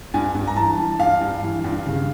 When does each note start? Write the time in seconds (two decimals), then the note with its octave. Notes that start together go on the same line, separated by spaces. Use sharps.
0.14 G2 G#5
0.35 G2
0.47 A#5
0.56 E3 A5
0.77 E3
0.99 G2 F5
1.21 G2
1.42 E3
1.64 G2
1.86 C#3